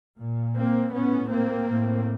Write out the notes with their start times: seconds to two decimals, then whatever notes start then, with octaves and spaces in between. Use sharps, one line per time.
0.18 A#2
0.56 A#3 C4
0.94 A2 B3 C#4
1.32 A#3 C4
1.69 A2